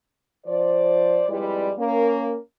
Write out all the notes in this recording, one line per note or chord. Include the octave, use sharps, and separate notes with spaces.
F3 C5 D5
F2 G3 G#3 E4 B4 D5
A#3 C#4 A#4